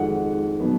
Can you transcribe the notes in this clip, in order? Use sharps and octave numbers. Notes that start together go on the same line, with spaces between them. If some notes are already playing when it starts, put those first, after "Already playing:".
Already playing: F2 D#3 G#3 F#4 F#5
B2 F#3 B3